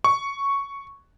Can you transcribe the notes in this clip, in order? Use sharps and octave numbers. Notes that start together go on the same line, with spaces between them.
C#6